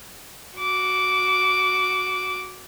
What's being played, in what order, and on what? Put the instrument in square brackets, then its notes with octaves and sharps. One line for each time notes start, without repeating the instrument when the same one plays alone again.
[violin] F#4 D6